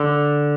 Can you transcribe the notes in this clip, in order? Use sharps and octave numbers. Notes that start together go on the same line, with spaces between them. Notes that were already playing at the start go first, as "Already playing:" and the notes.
Already playing: D3